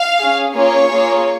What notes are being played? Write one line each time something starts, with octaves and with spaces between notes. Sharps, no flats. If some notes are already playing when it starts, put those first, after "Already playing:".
Already playing: F5
C#4 G#4
A#3 C#4 F4 G#4 C#5
A#3 F4 G#4